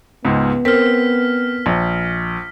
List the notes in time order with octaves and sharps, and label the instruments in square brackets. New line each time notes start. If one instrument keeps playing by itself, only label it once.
[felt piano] C#2 G#2 [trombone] B3
[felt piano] C4 [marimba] A#4 [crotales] F6 B6
[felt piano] A#1